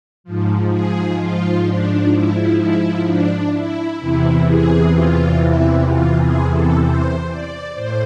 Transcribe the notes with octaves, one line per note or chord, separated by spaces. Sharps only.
G#2 F3
G#4
F4
D4
E4
E4
D4
E4
E2 C3 E3 E4
G#4
F4
E4
F4
G#4
A4
C5
D5
A2 C5